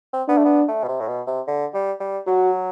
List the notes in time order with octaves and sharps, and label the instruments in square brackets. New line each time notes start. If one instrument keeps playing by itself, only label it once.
[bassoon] C4
[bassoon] B3 [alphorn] D4
[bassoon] A3
B3
A3
B2
C3
A2
B2
C3
D3
G3
G3
[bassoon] F#3 [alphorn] F#4